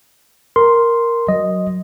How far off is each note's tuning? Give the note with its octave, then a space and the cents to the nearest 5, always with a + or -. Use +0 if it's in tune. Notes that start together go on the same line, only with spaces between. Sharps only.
A#4 +0 C6 +0
F#3 +0 D#5 +0